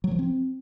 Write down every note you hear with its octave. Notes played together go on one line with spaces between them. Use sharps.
F#3
F3
C4